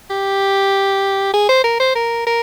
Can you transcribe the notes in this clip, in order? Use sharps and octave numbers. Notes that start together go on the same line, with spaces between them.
G4
G#4
C5
A#4
C5
A#4
A#4